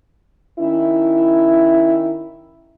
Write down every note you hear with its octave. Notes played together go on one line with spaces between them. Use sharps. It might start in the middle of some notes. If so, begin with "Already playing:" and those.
D#3 C#4 E4